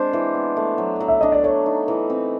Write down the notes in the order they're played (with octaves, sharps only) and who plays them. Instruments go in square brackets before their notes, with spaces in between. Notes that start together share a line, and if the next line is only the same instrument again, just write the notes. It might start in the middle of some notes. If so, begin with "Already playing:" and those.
Already playing: [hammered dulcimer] G#3 C4 D4 [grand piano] C5
[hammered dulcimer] E3
B3
A3
F#3
F#3
[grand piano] E5
[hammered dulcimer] D4 [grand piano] D#5
[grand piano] D5
[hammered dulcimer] A3 [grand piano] C#5
[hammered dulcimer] D#4
E3
C4